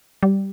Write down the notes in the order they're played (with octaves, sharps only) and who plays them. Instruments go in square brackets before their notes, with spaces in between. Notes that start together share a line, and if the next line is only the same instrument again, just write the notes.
[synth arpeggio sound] G3